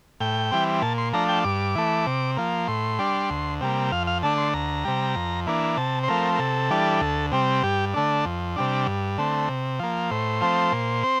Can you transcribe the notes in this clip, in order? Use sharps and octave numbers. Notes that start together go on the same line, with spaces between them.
A2 G5
E3 G3 C4
A#2 A5
C6
F3 A3 D4 A#5
G5
G2 D6
E3 A3
C3
F3 A#3
A2 C6
G3 D4
D2
C3 G3 A#3
F2 F5
F5
D3 A3 D4 A5
C6
D2 A#5
C3 G3
F2
E3 A#3 D4
C3 A5
C5
F3 A3 C4 A#4
A#4
C3 A4
E3 G3 D4
D2
C3 G3 C4
G2 G4
D3 A3 D4
F2
C3 G3 D4
G2
D3 A3 C4
C3
F3 A#3
A2 C5
F3 A3 C4
A#2
C4